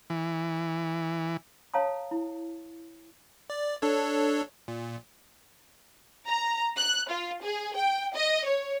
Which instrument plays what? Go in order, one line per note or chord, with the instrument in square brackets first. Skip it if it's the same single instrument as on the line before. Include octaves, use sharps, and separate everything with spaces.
[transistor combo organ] E3
[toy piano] C#5 F5 A5 A#5 D#6
E4
[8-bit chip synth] D5
D4 A4 C#5
A#2
[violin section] A#5
F#6
F4
G#4
G5
D#5
C#5